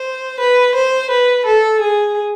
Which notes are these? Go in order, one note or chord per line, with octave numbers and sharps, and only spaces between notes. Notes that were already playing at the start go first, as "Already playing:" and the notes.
Already playing: C5
B4
C5
B4
A4
G#4